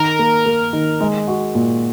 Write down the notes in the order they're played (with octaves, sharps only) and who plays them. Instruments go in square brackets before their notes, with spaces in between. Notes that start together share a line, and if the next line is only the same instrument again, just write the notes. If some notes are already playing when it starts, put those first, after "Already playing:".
Already playing: [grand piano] D#3 [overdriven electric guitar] A#4
[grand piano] A#3
A#3
D#3
G#3
F#4
A#2